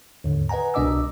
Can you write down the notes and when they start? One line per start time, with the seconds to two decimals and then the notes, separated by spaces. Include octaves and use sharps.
0.24 D#2 G#2 D3
0.49 B4 D#5 F#5 G#5 A#5
0.74 C2 B2 D4 D#5 D6 E6